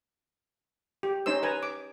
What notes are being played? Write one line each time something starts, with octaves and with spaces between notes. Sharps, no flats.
G4
C#4 D#4 C5 E6
B4 G#5 A#5
D6